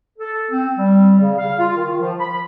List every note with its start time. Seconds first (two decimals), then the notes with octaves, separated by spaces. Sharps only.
0.19 A4
0.51 C4
0.78 G3
1.20 C#3
1.38 F5
1.59 F4
1.76 D#3
2.01 F3
2.19 B5